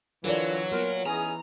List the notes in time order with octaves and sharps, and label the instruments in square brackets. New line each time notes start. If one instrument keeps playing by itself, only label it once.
[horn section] D3 E3 [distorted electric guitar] F#3 [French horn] F4 [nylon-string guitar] A#4 D5
[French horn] A#2 [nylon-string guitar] B3 [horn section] F4 F#4 A#4
[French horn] E3 [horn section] C#4 D#4 G#4 [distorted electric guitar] A#5